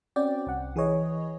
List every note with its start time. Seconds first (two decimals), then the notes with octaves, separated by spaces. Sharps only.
0.16 C4 C#4 F#4 D5 G5
0.46 C2 F#5
0.76 E3 G#4 B4 C#5 D#5